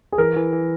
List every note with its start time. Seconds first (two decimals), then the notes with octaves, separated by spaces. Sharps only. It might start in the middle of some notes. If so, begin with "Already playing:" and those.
0.12 G#4
0.18 E3 A#4
0.36 E3
0.52 E3